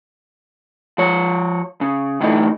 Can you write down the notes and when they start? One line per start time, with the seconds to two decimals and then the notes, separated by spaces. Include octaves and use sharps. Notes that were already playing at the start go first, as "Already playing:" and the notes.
0.98 F3 C#5
1.81 C#3
2.20 D2 A2 E3 D#4